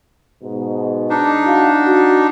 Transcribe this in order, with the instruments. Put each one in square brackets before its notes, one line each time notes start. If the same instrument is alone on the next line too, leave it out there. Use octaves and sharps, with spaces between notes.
[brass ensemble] G#2 B2
[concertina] D4 D#4
[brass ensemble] E4 F#4 F5
F#4